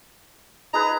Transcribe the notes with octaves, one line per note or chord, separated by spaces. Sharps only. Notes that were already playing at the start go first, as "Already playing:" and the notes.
D#4 G#4 B4 A#5